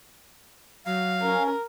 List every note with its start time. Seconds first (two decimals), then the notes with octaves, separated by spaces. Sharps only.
0.86 F#3 F5
1.22 C#4 A#4